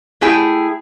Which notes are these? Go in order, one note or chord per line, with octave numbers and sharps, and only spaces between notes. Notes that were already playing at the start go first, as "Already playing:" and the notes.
A3 E4 G#4 G5